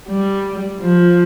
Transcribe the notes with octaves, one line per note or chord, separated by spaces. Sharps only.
G3
F3